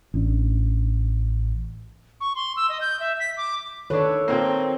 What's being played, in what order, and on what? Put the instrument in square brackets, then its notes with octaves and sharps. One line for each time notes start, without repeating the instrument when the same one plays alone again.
[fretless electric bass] A1 D4
[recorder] C#6
C6
E6
D#5
G6
E5
B6
D6
[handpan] D#3 A4 C#5 [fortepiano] D4 B4
[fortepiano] A#2 A#3 [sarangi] C4